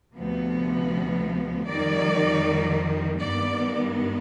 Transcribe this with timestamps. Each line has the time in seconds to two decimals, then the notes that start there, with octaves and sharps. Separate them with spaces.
0.16 D2 C3 F3 B3
1.67 F2 D#3 G3 D5
3.20 G2 D#3 B3 D5